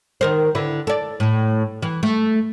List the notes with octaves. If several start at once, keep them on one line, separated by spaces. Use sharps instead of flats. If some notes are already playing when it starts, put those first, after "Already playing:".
D#3 A#4 C5
D3 E4 B4
A4 D5
A2
E3
A3